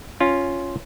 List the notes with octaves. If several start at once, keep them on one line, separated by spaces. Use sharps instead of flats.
C#4 F4